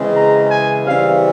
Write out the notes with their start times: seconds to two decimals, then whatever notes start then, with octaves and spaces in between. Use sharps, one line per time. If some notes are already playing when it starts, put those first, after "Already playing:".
Already playing: C#3 E3 G#3 C4
0.16 A#5
0.51 G#5
0.86 C#3 E3 G3 C4 F5